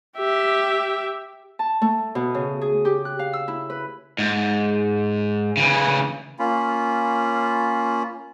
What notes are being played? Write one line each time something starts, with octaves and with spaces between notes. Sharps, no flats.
G4 E5
A5
A3
B2
C#3
G#4
G4
F#6
F5
E6
E4
B4
G#2
C#3 E3
A#3 C#4 F4 B5